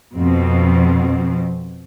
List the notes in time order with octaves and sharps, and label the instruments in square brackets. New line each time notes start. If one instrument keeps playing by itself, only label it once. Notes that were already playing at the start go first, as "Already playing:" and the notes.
[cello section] F2 B2 C4